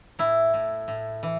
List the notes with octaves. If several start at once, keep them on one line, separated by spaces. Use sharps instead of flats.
A2 E4
A2
A2
E3